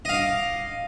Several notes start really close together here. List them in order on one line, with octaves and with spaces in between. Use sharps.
D#5 F5 D6